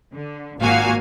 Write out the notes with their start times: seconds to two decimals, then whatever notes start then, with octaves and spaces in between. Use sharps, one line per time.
0.14 D3
0.58 G#1 A#2 A#3 F#4 F5 G#5